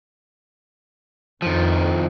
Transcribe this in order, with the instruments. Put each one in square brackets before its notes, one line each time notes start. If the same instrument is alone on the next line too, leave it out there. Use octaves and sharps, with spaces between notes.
[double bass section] F2 [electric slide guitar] D#3 F3